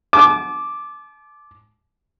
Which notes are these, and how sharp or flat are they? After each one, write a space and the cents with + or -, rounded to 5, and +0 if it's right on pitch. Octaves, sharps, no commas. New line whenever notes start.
A5 -40 D6 +0